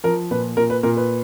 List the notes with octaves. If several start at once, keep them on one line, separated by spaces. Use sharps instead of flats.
F3 A#4
A#2 B4
A#2 A#4
B4
A#2 A#4
B4